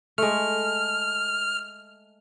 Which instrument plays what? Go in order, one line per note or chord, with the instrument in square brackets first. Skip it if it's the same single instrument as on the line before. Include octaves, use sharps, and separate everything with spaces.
[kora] G#3 A3 [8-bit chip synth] F6